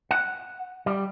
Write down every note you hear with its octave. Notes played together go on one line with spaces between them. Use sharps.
F#5
G3